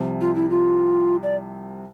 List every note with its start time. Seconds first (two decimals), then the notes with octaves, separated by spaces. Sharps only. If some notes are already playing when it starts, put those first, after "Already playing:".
Already playing: C2 C3 F3
0.21 F4
0.35 E4
0.50 F4
1.23 D5